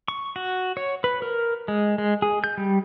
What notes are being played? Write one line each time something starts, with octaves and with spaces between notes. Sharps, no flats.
C#6
F#4
C#5
B4
A#4
G#3
G#3
G#4
G6
G3